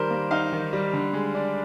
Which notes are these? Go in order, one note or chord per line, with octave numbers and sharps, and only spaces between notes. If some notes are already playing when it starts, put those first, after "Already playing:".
Already playing: D#3 G3 A#4 C5
A#3
D#4 F5
D#3
G3
D3
G#3
D4